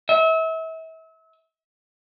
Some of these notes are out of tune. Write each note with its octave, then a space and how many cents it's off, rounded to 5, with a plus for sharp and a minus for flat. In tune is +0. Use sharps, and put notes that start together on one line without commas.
E5 -35